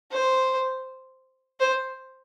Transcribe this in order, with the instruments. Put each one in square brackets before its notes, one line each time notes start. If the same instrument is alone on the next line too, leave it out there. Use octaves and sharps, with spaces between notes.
[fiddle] C5
C5